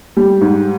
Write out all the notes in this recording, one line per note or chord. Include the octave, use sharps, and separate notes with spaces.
G3
G#2